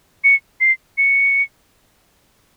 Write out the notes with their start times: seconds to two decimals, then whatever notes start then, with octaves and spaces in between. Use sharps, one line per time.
0.24 C#7
0.61 C7
0.98 C#7